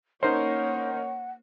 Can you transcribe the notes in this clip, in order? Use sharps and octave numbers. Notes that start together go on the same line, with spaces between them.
A#3 C#4 D#4 A#4 C5 C#5 F#5